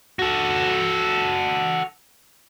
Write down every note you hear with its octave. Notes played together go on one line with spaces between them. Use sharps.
F#4 A4